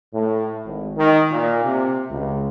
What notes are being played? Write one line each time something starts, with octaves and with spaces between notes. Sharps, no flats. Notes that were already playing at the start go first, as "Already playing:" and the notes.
A2
G#1
D#3
A#2
C3
C#2